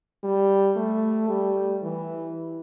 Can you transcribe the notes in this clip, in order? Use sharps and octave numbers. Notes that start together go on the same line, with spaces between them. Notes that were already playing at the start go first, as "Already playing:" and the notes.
G3
A3
G3
E3